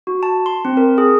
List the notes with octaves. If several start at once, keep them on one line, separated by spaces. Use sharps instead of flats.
F#4
A5
C6
C4
A#4
G#4